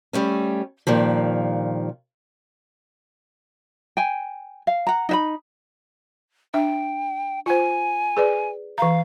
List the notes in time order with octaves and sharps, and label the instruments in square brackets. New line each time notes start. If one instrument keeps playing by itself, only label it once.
[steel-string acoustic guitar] G3 A3 C#4
G2 A#2 D#3 F3
[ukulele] G5 G#5
F5
F#5 A#5
D#4 E5 B5
[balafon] D4 E5 [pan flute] G5
[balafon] F4 C5 [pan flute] G#5
[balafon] G#4 B4 D5
[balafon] E3 A#5 [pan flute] F5